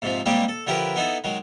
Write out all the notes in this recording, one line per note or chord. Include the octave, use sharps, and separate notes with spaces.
G#2 C3 F3
G3 G#3 A#3 C4 D4 G4
A4
D3 F3 E4 G4 A#4 B4
B3 D#4 E4 A4
D#3 F#3 G#3